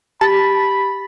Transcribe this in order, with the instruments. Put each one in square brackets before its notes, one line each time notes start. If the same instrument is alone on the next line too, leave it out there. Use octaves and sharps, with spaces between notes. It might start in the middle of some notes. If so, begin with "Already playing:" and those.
[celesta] G4 [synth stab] A5 [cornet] B5